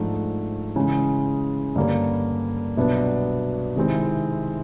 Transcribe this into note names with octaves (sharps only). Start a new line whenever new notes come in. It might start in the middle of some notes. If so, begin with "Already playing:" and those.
Already playing: G#2 F3 A3 D4
C#3 E3 G#3
G2 D3 G3 A#3 C#4
C2 B2 F#3 B3 D4
C3 D#3 G#3 C4 E4